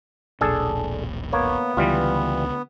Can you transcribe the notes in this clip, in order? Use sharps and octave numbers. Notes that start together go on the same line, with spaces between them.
E1 B1 A#2 D4 G#4 A4
A#3 B3 C#5
C#2 D3 E3 G3 F4